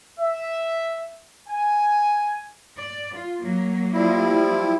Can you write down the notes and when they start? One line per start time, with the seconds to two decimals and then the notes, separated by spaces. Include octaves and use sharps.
0.20 E5
1.49 G#5
2.78 D5
3.14 F4
3.43 F#3 A#3
3.93 F3 G3 E4